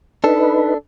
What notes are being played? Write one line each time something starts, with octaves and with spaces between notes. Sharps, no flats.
D4 D#4 A4 B4